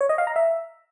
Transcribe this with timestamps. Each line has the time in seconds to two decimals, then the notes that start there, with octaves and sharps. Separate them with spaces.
0.01 C#5
0.09 D#5
0.18 F5
0.27 A#5
0.36 E5